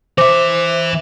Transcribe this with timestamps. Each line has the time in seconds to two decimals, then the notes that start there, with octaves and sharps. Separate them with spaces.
0.18 E3 C5 E5 D6